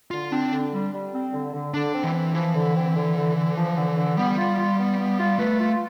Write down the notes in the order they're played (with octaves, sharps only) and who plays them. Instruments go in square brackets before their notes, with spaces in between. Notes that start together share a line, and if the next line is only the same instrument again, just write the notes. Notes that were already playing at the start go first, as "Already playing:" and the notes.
[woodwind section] D3 [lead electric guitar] F4
[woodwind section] C4 [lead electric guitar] D4
[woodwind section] D3
G3
G3
C4
D3
D3
[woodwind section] D3 [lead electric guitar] D4
[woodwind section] C4
[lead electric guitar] E3
[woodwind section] C4
[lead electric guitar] E3 [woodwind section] F3
[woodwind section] D3
C4
D3
D3
D3
F3
D3
D3
[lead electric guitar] G3 [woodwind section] B3
[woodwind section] F4
F4
B3
B3
F4
[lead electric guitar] A3 [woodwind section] B4
[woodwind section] F4